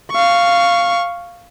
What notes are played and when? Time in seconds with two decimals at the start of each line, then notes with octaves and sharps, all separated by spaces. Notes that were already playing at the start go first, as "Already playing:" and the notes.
0.12 F5 C#6